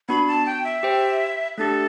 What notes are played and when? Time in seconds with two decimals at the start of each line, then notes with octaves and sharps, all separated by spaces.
0.09 B3 D4 F#4 B5
0.27 A5
0.46 G5
0.64 E5
0.83 G4 C5 G5
1.58 A3 D4 G4 A4